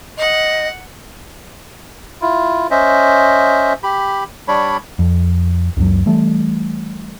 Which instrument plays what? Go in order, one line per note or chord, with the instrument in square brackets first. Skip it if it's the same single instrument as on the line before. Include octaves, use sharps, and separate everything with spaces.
[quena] D#5 [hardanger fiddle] F#5
[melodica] E4 F4
C#4 C5 D#5 E5
G4 B5
G3 D4 C#5 B5
[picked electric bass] F2
C#2 F#2 F#3
E3 G3 A3